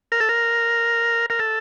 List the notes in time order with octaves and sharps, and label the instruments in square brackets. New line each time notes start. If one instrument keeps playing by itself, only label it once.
[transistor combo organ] A#4
A4
A#4
A#4
A4